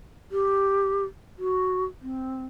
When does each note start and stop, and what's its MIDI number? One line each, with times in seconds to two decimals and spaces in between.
0.32 1.04 67
1.38 1.85 66
2.02 2.45 60